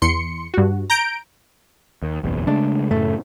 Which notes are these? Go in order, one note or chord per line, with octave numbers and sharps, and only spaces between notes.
E2 C6 C#7
G2 F#4
A#5 G6 D7
D#2
F#1 B1 E2
C#3 G#3 A3 D4
F#2 A2 C#3 A3